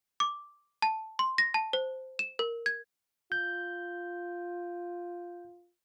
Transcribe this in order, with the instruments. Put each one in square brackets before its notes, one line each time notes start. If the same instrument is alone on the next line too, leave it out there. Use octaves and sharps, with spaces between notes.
[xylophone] D6
A5
C6
A#6
A5
C5
E7
A#4
G#6
[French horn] F4 [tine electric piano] G6